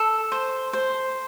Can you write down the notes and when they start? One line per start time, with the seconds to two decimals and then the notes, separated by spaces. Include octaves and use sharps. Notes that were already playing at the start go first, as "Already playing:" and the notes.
Already playing: A4
0.32 C5
0.73 C5